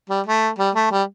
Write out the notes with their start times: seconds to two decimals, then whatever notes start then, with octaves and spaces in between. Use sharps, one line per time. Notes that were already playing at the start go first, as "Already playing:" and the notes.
0.09 G3
0.26 A3
0.59 G3
0.75 A3
0.91 G3